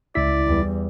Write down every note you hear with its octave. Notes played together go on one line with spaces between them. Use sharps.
C#2 E4 D5 B6
E2 G3